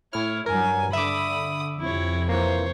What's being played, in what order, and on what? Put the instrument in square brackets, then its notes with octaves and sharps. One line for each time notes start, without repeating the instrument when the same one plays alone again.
[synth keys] A2 F6 [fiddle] E4 C#5
[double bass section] G2 F#3 [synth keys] A#4 [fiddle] G#5
[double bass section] D3 [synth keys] E5 D6 [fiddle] B5 D#6
[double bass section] F2 C3 [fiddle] E4 C#5
[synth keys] E3 A#3 [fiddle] C5 C#5